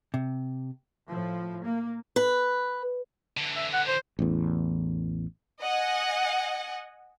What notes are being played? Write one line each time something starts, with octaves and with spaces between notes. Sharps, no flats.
C3
A2 F3
A#3
B4
D3 E3
E5
F#5
C5
A1 E2
D#5 F#5 G#5